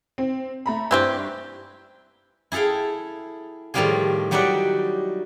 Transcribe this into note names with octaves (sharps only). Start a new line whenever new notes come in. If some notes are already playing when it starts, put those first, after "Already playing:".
C4
A3 A#5 B5
G2 E3 C4 G4
E4 G#4 A4 F5 G5
A2 D#3 F3 G3 F4 G#4
F#3 G3 D#4 D5 E5 F#5